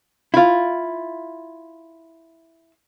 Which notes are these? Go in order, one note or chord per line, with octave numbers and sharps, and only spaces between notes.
E4 F4